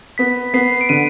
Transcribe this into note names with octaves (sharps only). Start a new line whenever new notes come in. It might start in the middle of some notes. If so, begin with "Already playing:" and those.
B3 B6
B3 C7
D7
D3 D#7